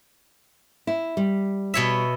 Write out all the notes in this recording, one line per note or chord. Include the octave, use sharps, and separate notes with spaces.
E4
G3
B2 C#5 E5